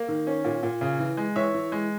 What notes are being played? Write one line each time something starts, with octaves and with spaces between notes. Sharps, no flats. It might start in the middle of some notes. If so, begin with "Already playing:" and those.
Already playing: A#3
D#3
C#4
A#2
A#2
C#3
E3
G#3
E3 C#5 E5
E3
G#3